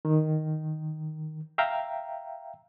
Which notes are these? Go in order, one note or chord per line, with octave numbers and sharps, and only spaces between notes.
D#3
E5 F5 G5 A#5